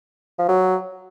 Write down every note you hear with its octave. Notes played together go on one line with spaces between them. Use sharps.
F3
F#3